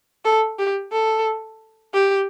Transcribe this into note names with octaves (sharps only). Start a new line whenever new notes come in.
A4
G4
A4
G4